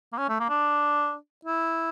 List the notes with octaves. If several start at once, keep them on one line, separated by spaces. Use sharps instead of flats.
A#3
C#4
A3
A#3
D4
E4